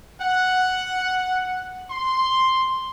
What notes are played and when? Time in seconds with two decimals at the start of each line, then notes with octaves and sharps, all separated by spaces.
0.21 F#5
1.91 C6